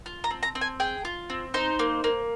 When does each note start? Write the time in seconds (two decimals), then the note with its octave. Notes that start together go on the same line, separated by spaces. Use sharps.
0.06 F4
0.24 A#5
0.31 C4
0.43 A#5
0.55 C4
0.61 G#5
0.80 G#4 G5
1.05 F4
1.30 C4
1.54 D#4 C5
1.79 A#3
2.04 A#3